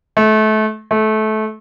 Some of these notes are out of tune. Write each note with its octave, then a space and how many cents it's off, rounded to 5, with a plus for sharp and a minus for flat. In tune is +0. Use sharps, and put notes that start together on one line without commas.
A3 -30
A3 -25